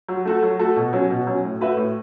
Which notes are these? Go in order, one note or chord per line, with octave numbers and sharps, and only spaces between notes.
F#3
A3 F#4 A4
F#3
A3 F#4 A4
B2
F#3 C#4
B2
F#3 C#4
A2
A3 F#4 B4 E5
A2